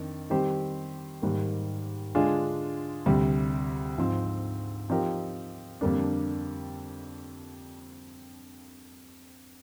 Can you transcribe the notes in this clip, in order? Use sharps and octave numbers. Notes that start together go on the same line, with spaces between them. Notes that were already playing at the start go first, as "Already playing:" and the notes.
Already playing: F2 D#3 D4
D#3 G3 C4 G4 C5
G#2 D#3 G3 A#3
D3 G#3 D4 F4 G#4
D2 C3 G3
G#2 F3 C4
F3 C4 D#4 G4 A#4
F2 D3 G3 A#3 D4